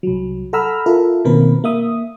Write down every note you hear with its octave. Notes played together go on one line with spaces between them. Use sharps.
C2 F#3
A4 F#5 A#5 B5 E6 F6
F4 A4 A#4 E5
B2 D#3 A#3 C4 A#4 B4
A#3 E5 D#6